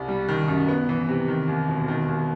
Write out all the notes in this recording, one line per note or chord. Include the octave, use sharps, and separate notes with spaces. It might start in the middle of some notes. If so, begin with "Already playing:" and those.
Already playing: C2
G3
D#3
F#2
B3
E3
C3
D#3
D#2
E1
D#3
D#2